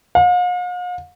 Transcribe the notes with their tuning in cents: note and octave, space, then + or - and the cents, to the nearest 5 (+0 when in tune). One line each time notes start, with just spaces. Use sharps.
F5 +45